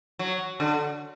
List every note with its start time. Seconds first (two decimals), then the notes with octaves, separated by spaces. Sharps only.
0.19 F#3
0.60 D3